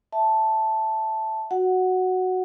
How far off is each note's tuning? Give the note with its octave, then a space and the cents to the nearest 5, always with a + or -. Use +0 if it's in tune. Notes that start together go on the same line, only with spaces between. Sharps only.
E5 +0 A5 +0
F#4 +0 F#5 +0